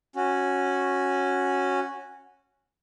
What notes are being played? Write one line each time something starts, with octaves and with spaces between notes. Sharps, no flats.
C#4 F#4